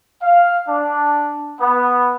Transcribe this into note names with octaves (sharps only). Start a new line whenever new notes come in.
F5
D4
B3